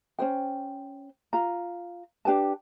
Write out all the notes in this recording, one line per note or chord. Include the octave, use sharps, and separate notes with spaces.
C#4 G#4 C5 G5
F4 A#5
D4 G4 B4 A5